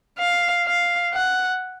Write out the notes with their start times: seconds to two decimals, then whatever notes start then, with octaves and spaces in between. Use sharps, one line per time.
0.19 F5
0.66 F5
1.14 F#5